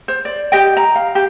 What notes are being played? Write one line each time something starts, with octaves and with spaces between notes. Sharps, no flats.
C5
D5
G4 D#5 G5
A#5
F5
G4